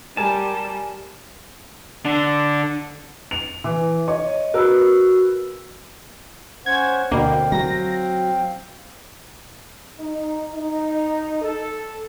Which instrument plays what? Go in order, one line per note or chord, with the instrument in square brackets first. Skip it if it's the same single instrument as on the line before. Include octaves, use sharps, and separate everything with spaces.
[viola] G3 [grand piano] A#4 G#5 [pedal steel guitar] A5
[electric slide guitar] D3 D4
[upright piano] F7
E3
[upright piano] C#5 [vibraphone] D#5
[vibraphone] F#4 E6 [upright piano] A#4 B4
[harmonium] C#4 C5 F#5 [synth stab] G#6
[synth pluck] D2 B2 D3 [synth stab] A#3 [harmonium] C4 F5 G5
[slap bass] F#3 [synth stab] A#6
[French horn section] D#4
D#4
A4